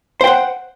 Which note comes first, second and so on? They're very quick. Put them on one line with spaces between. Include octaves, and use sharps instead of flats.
C5 G5 F#5